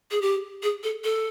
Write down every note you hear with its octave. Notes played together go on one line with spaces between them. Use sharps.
G#4
G4
G#4
A4
A4